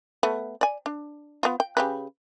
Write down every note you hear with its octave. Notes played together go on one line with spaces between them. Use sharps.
A3 B3
D5 G#5
D4
B3 F4
G5
C#3 G4 B4